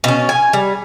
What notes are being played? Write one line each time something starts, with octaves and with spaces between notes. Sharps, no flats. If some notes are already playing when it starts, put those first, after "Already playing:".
B2 C#4
G#5
G3